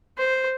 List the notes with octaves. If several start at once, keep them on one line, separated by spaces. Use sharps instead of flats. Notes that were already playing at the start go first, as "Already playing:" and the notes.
C5